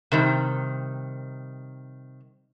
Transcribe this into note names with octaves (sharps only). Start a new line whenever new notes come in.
C3 D#3 G3